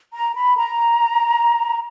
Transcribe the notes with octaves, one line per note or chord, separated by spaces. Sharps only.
A#5
B5
A#5